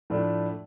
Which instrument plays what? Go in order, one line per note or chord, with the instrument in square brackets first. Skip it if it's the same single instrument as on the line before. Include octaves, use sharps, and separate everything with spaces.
[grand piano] A2 F3 A3 D4